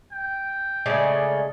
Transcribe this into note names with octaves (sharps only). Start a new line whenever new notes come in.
G5
C#3 G#3 A3 D5